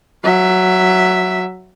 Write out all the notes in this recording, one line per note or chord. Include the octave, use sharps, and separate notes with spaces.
F#3 E5